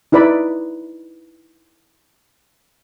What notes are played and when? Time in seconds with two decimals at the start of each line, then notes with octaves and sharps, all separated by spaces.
0.12 D#4 E4 B4 D5 B5